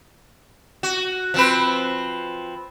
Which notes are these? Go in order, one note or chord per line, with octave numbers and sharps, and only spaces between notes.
F#4
F3 C4 B4